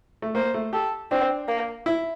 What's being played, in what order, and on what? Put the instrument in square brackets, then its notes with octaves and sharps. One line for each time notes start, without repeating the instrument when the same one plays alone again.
[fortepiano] A3
[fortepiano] A#3 [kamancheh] C5
[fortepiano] A3
[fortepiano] G4 [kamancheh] A4
[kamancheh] C4 [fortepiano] D4
[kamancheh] A#3
[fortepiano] E4